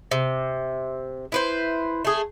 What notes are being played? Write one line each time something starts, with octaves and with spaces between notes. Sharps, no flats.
C3
E4 B4 C5
A3 G#4